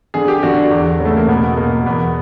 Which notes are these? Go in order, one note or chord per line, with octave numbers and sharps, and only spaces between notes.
D3 G#4
G4
D3 F#4
D4
E2
C#3
A3
A#3
B2 B3
B2 A#3
E2 B3